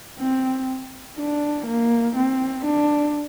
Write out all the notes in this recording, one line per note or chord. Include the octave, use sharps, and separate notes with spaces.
C4
D4
A#3
C4
D4